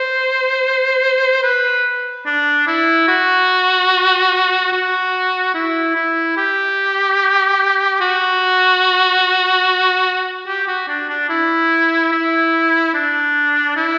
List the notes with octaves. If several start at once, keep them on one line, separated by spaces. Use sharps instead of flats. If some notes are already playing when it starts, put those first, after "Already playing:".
Already playing: C5
B4
D4
E4
F#4
F#4
E4
E4
G4
F#4
G4
F#4
D4
D4
E4
E4
D4
E4